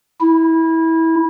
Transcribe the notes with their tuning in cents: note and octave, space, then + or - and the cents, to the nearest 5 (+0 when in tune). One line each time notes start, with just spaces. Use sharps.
E4 -20